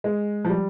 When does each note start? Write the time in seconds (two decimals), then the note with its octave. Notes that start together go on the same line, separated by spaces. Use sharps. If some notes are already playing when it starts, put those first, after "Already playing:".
0.04 G#3
0.44 F3
0.50 G3